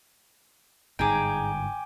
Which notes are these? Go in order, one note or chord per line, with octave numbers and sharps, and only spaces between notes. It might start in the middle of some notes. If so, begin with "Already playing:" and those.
G1 G#2 D#4 G#4 G5 G#5 D6